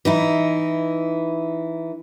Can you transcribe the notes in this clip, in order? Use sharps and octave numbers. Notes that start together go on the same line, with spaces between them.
E3 D#4 E4